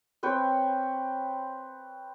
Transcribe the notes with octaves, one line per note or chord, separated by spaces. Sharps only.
C4 B4 C#5 G5